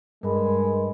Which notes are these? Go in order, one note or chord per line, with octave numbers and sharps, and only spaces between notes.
G2 G#3 A#4 B5